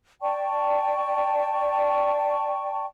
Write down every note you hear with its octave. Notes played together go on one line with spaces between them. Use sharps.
D5 G5 A5 C#6